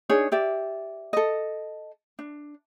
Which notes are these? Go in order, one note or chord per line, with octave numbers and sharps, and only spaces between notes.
D4 D#4 G#4 C#5
G4 D5 E5
A4 D#5
D4